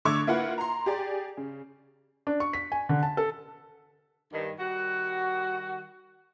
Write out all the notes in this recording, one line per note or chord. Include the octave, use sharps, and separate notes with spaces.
D3 A3 C#6 D6 E6 G#6
A#3 E4 F4 B4 F#5
A#5 C6
G4 G#4 D5
C#3
D4
C#6
B6
G#5
D3
A5
A4
G2 D#3
D#3 G3 F#4